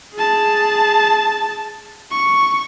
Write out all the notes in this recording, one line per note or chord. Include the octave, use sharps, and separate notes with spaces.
G#4 A5
C#6